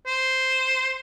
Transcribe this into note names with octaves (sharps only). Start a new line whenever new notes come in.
C5